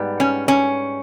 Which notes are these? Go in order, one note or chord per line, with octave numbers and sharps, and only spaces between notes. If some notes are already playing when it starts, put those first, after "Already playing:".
Already playing: G#2 G3 B3
C#4
C#4